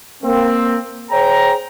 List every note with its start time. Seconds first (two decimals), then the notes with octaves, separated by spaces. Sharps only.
0.23 A#3 C4
1.11 G#4 C5 C#5 G5 A#5